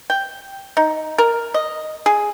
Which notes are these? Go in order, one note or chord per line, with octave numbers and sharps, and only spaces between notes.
G5
D#4
A#4
D#5
G#4